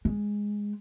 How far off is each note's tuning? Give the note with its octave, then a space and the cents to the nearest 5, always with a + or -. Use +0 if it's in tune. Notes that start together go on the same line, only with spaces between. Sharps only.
G#3 -5